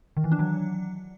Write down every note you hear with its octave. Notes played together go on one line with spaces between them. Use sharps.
D#3
E3
D4
F#3